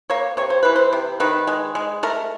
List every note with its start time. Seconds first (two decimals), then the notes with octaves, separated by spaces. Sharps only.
0.10 A#3 C#5
0.37 C3 C#5
0.50 C5
0.63 E3 B4
0.76 C5
0.93 C3
1.20 D#3 B4
1.47 G#3
1.75 G#3
2.03 A3 A#4